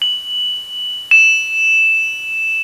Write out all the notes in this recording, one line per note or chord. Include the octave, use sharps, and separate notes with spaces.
F#7
E7